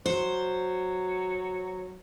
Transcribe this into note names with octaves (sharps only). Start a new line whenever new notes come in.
F#3 C5